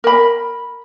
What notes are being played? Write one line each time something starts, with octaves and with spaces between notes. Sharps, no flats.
A#4 B5